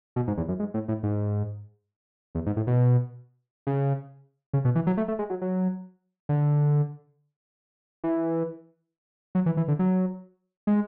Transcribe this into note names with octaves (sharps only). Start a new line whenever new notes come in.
B2
G#2
E2
F#2
G#2
A2
A2
G#2
E2
G#2
A2
B2
C#3
C#3
B2
E3
F#3
A3
A3
G#3
F#3
F#3
D3
E3
F#3
E3
E3
D3
F#3
G#3